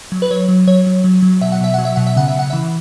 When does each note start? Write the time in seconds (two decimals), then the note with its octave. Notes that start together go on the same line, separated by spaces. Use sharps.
0.12 F#3
0.22 B4
0.30 F#3 C#5
0.48 F#3
0.67 F#3 C#5
0.87 F#3
1.04 F#3
1.22 F#3
1.41 B2 E5
1.52 F#5
1.61 B2 E5
1.74 F#3 F#5
1.85 E5
1.96 B2 F#5
2.06 E5
2.17 C#3 F#5
2.28 E5
2.35 C#3 F#5
2.50 E3 E5